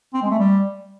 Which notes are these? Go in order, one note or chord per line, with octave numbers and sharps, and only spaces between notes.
C4
G#3
A3
G3